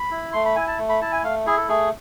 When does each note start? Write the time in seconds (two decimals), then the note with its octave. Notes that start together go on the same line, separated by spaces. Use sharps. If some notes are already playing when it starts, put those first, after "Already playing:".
Already playing: B5
0.11 E4
0.33 A3 C6
0.45 B5
0.56 E4 G#5
0.68 A5
0.78 A3
0.89 B5
1.01 E4 A5
1.12 G#5
1.24 A3 F5
1.46 E4 G#4
1.57 A4
1.68 A3 G#4